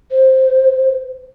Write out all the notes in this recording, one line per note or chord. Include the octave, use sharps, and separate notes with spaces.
C5